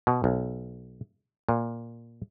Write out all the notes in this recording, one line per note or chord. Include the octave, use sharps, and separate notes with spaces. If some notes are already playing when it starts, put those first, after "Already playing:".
B2
B1
A#2